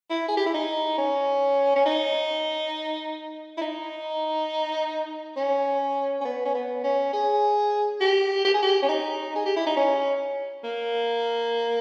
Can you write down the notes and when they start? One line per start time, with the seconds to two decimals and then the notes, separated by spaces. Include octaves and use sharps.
0.10 E4
0.28 G#4
0.37 G4
0.46 E4
0.54 D#4
0.98 C#4
1.75 C#4
1.86 D#4
3.57 E4
3.61 D#4
5.37 C#4
6.21 C#4
6.25 B3
6.45 C#4
6.55 B3
6.84 C#4
7.13 G#4
8.01 G4
8.45 G4
8.54 G#4
8.62 G4
8.82 C#4
8.89 D#4
9.36 G#4
9.46 G4
9.56 E4
9.66 D#4
9.76 C#4
10.64 A#3